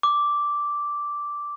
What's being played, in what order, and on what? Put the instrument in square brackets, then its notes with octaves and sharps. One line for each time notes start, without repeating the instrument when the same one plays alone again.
[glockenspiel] D6